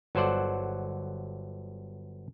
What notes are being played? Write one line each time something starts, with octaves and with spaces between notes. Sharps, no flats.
G1 F#3 A4 C5 D5 F#5